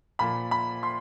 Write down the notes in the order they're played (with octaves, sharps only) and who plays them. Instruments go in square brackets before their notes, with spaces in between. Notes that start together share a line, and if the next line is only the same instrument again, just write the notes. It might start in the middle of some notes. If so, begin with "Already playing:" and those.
[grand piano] A#2 F3 B5
B5
C6